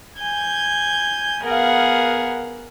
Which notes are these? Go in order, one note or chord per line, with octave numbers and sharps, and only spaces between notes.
G#5 G6 G#6
B3 G#4 A#4 F5 F#5